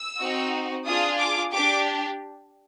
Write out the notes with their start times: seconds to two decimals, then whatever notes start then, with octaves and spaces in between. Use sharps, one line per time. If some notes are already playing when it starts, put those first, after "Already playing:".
Already playing: E6
0.19 C4 D#4 F#4
0.86 D4 F4 G#4 D#6
1.19 D6
1.52 D4 G4 D6